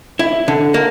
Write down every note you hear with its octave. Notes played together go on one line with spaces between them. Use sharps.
E4
D3
A#3